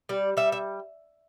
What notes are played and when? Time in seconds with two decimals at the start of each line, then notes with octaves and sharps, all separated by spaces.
0.09 G3 D5
0.37 G3 E5
0.52 E5